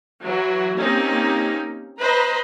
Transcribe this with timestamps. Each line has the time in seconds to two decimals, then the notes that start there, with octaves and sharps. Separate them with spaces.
0.24 E3 F#3 F#4
0.78 A#3 C4 C#4 D#4 G4
2.00 B4 C5 D#5 A#5 B5